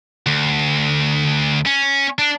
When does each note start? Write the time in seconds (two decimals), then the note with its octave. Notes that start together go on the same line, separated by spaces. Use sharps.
0.26 D2
1.66 C#4
2.19 D4